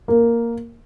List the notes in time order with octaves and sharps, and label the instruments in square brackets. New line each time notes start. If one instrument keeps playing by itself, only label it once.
[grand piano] A#3